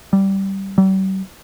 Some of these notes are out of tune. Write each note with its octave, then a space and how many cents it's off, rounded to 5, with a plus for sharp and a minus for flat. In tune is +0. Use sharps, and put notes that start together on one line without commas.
G3 -10
G3 -45